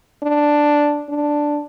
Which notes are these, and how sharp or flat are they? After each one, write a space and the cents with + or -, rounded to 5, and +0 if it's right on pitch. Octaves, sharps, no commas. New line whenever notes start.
D4 +0
D4 +0